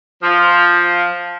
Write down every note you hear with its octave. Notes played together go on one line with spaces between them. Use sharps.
F3